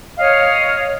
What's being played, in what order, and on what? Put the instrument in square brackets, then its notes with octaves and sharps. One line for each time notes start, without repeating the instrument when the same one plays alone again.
[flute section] C#5 D#5 F5